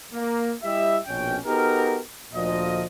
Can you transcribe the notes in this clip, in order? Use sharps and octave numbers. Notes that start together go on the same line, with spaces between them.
A#3
G3 E4 G4 D#5 E5
A#1 B2 C#4 G5
B3 D#4 F#4 G4 A4 A#4
D2 A#2 F3 D#5